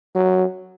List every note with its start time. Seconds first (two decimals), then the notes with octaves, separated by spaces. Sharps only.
0.15 F#3